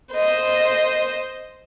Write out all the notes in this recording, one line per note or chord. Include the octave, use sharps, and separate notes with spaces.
C5 D#5